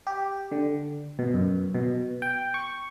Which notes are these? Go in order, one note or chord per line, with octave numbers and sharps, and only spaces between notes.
G4
D3
B2
F#2
B2
G5
C#6